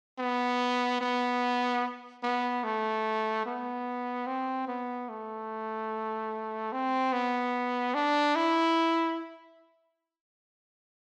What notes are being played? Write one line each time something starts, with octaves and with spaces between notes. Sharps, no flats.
B3
B3
B3
A3
B3
C4
B3
A3
C4
B3
D4
E4